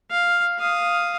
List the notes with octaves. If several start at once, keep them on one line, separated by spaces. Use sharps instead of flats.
F5
F5 D#6